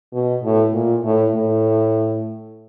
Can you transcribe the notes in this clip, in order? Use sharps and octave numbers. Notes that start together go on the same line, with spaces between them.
B2
A2
A#2
A2
A2